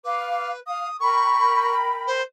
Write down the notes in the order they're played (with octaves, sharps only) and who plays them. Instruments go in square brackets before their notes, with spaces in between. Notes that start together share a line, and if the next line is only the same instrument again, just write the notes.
[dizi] B4 [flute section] F5 D6
[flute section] F5 [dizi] D#6
[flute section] A#4 G5 B5 [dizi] C#6
[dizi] C5